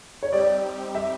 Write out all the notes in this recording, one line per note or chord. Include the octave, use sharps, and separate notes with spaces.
C#5
G3 C4 D#4 G4 D5
E5